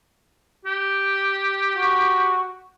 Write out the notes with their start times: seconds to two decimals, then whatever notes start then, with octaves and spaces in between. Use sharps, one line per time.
0.65 G4
1.77 F#4